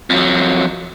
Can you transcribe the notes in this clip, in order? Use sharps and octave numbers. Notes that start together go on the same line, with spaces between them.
F2 F#3